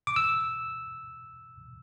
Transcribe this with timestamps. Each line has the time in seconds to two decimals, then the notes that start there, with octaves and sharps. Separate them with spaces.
0.07 D6
0.16 E6